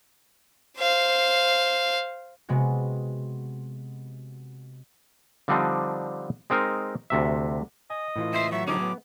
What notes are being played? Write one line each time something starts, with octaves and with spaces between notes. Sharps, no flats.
C5 F5
C3 G#3 B3 F#4
D3 F3 G3 C4 D4 D#4
G#3 C4 D#4 A#4
D2 C3 E5
D#5 G#5
A2 E3 F4
C#2 C5 E5 C6
F#3 E5 C#6
A2 D3 F3 F#3 C#4 D#4 G#4 D6
B3